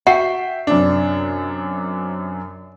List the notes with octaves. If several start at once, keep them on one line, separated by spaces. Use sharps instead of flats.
F#4 E5 G5 C7
F#2 C3 D4